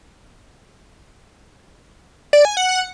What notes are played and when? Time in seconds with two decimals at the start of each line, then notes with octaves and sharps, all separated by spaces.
2.33 D5
2.45 G#5
2.57 F#5